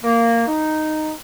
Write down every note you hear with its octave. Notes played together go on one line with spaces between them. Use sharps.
A#3
D#4